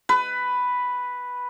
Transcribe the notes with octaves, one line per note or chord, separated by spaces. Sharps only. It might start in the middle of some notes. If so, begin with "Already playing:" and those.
B4